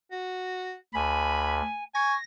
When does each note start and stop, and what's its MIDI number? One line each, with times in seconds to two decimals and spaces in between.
0.12 0.74 66
0.94 1.62 38
0.94 1.83 80
0.94 1.65 83
1.95 2.14 80
1.95 2.15 85
1.95 2.24 94